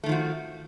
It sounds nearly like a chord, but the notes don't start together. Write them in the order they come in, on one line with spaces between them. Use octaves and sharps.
A3 D#3 F3 F#4